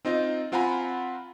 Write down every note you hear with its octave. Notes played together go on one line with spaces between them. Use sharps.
C4 D#4 F4 D#5
C4 F4 F#5 G#5 A#5 B5